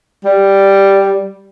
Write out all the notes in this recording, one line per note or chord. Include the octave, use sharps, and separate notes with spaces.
G3